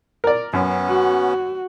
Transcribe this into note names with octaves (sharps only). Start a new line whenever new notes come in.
A#4 D5
F#2 B3 C#4
F#4